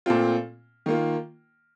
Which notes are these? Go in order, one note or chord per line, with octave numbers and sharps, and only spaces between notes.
A#2 A3 C4 F4
D#3 A#3 F4